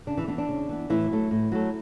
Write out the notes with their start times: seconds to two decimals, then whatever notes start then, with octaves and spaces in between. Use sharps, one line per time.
0.07 C#3 D4
0.17 E3 E4
0.28 E3 B3 D4
0.38 D4
0.49 C#3
0.69 E3 B3
0.90 A2 E3 E4
1.11 F#3 A3
1.31 A2
1.52 F#3 A3